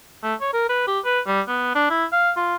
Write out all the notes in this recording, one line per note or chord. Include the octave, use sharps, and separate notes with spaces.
A3
C#5
A#4
B4
G4
B4
G3
B3
D4
E4
F5
F4